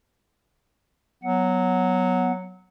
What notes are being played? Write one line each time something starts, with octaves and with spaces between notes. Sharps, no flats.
F#3 B3 F#5